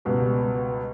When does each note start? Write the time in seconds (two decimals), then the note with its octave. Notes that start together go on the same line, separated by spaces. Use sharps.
0.05 C#2 B2 G3 B3